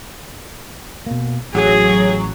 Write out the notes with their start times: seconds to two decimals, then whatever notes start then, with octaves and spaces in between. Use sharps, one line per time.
1.06 B2 A#3
1.55 A1 F#3 G#4